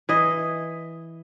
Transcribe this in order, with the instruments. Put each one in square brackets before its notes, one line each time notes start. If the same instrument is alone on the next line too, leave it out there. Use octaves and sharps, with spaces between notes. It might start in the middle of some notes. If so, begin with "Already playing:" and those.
[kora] E3 D#5